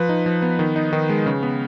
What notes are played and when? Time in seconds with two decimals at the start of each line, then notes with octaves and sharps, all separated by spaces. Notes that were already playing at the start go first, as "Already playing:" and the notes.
Already playing: F3 B4
0.09 D#4
0.26 F3
0.42 B3
0.59 D#3
0.76 D#4
0.93 D#3
1.09 G#3
1.26 C#3
1.43 B3